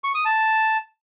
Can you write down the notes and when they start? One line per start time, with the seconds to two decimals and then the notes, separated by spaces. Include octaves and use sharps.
0.04 C#6
0.15 D#6
0.25 A5